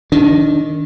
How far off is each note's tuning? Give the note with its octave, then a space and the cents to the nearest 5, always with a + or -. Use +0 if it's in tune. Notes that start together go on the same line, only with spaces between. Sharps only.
D#3 +0 D4 -30